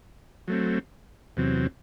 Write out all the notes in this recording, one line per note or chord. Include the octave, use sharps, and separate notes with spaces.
F#3 A3 C4
E2 C3 F#3 C4